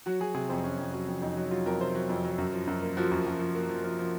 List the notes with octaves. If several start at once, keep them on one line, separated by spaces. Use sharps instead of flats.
F#3 F#4
F#3 G#4
C3 G#4
F2 C5
F2 C#4
F2
F#3
F2
F2 D#4
F#3
F#3 F4
F2 A#4
C3 C5
F#3
F2
F#3
F#2
F3
F#2
A#3
F3 F#4
F#2
F#2
F3
A#3
F3
F3
F3